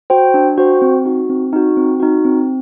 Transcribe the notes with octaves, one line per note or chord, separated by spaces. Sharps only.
F#4 C5 G5
D4
F#4 C5 G5
C4
D#4 F#4
C4
D#4 F#4
C4
D#4 F#4
C4